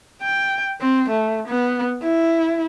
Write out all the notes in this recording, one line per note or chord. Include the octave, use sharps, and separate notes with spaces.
G5
C4
A3
B3
E4